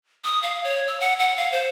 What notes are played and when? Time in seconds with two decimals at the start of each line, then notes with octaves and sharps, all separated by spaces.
0.24 D#6
0.43 F5
0.64 C#5
0.88 E6
1.00 F#5
1.19 F#5
1.37 F5
1.52 C5